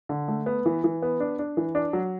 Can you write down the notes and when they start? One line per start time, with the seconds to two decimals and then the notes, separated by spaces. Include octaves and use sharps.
0.09 D3
0.28 A3
0.46 B3
0.66 E3
0.84 E3
1.02 B3
1.20 D4
1.39 D4
1.57 E3
1.75 D4
1.93 F#3